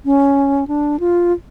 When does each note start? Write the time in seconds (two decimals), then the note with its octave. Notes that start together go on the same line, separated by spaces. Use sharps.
0.05 C#4
0.68 D4
1.00 F4